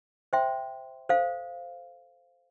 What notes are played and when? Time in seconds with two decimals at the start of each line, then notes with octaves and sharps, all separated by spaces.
0.33 C5 E5 G5 C6
1.09 A4 C5 F5